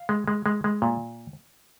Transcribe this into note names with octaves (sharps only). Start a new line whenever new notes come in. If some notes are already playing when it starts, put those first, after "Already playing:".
Already playing: F5
G#3
G#3
G#3
G#3
A#2